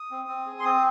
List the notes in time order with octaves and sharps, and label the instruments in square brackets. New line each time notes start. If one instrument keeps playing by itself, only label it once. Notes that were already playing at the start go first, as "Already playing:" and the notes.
Already playing: [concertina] D#6
C4
C4
G#4
C6
C4 D#6